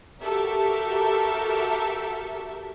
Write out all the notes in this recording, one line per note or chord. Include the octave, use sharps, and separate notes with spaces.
F#4 G4 A4 A#4 E5